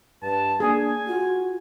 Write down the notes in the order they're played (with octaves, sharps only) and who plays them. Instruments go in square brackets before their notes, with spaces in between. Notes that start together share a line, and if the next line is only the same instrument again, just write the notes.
[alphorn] G2 [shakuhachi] B4 [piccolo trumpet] A5
[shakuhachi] A#3 [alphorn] D4 [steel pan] G#4 [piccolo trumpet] G#5
[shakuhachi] F4 [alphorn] F#4